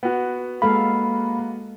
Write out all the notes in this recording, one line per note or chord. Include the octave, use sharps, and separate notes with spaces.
B3 F#4
G#3 A#3 A4 F5 B5